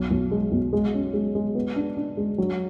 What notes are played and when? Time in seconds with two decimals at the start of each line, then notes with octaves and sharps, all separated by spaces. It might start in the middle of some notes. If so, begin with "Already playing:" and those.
Already playing: B1
0.11 B1
0.31 G#3
0.52 B1
0.73 G#3
0.94 C#4
1.14 G#3
1.35 G#3
1.55 B3
1.76 D4
1.97 D4
2.17 G#3
2.38 F#3